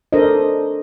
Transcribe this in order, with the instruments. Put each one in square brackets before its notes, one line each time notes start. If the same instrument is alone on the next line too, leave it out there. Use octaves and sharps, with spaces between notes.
[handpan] D4 A4 A#4 C5 D#5